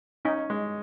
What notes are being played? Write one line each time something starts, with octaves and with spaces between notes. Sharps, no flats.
C#4 D#4
G#3